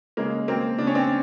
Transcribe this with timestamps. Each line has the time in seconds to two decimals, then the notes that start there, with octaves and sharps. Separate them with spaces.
0.17 C#3 G#3 A#3
0.48 F#3 A#3 C4
0.78 C#3 D4
0.87 C#4
0.95 C4 D4